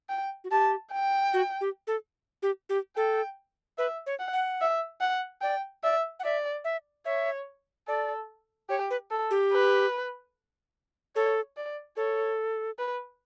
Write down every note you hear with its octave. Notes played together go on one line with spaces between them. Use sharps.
G5
F#4
G4 A5
G5
F#4
G4
A4
G4
G4
A4 G5
B4 E5
C#5
F#5
F#5
E5
F#5
D5 G5
D5 E5
F#5
D5 E5
E5
C#5 E5
A4 D5
G4 C#5
B4
A4
G4
B4
A4 C#5
D5
A4 C#5
B4